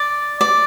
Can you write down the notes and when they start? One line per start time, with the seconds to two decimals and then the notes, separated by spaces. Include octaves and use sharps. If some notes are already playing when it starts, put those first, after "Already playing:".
Already playing: D5
0.41 D5